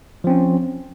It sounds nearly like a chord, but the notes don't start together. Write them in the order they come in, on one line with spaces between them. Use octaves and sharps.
F3 C4 C#4